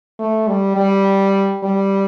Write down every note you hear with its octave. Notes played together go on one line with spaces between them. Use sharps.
A3
G3
G3
G3